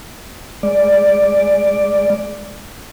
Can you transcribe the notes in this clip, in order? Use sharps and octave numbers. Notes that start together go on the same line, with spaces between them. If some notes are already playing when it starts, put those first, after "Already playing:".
G#3 D5